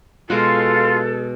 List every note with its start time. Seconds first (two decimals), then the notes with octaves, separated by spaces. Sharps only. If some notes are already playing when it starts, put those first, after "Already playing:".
0.30 B2 G#3 F4 F#4 A4 C6